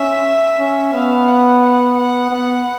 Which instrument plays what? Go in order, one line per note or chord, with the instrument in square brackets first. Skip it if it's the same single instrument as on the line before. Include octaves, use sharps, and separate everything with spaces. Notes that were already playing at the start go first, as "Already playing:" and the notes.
Already playing: [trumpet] C#4 [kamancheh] E5
[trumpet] C#4
[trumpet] B3 [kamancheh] F5
[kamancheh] F#5
F#5
F#5
[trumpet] B3